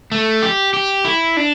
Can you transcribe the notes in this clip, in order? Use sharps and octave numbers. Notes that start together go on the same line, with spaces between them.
A3
G4
G4
E4
D4